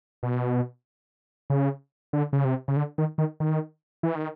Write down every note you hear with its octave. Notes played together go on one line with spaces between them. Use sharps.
B2
C#3
D3
C#3
C3
C#3
D3
D#3
D#3
D#3
E3
D#3